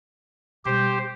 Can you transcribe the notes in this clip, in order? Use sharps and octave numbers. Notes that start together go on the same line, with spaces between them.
B2 G3 G4 C5